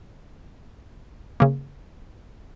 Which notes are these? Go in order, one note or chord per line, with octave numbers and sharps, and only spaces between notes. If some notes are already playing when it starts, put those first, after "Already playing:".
C#3 A#3